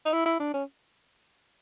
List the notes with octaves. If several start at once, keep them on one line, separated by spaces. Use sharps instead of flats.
D#4
E4
E4
D4
C#4